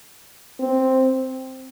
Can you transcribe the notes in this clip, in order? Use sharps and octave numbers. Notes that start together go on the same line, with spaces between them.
C4